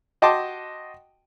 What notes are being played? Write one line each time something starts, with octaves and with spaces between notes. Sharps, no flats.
F#4 D#5 G5 A5 C6 D6